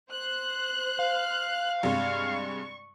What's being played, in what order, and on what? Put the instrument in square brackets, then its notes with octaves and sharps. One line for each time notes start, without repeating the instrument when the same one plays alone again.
[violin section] C5 F#6
[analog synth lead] F5
[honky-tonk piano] G2 C3 G#3 [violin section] C#6